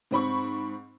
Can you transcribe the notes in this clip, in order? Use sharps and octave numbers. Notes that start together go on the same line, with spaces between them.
G#2 C4 B5 C#6